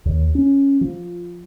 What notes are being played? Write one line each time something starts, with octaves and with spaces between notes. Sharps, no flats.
D#2
C#4
F3